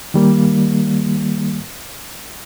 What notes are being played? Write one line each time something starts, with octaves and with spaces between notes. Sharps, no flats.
D#3 G3 A#3